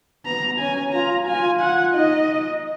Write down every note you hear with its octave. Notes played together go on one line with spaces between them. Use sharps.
B3 A#5
C#4 G#5
F4 A#5
F4 G#5
F#5
D#4 D#5